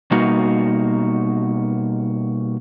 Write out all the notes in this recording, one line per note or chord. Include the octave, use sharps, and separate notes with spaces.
B2 G3 A#3 D#4 F#4